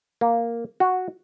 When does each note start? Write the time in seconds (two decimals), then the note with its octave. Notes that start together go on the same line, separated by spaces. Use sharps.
0.21 A#3
0.80 F#4